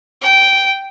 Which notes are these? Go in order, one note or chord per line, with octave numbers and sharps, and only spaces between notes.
G5